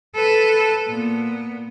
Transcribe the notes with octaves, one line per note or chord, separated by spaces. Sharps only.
A4 B4
A#2 B3